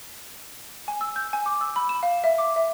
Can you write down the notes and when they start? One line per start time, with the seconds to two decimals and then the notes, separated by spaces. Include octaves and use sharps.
0.88 G#5
1.01 E6
1.16 G6
1.33 G#5
1.46 D6
1.61 E6
1.76 B5
1.89 E7
2.03 F5
2.24 E5
2.38 D6
2.56 E5